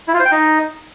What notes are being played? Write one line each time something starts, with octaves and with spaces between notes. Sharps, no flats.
E4
F4
C5
G5
D#4